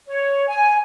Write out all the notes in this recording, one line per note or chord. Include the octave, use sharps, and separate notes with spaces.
C#5
G#5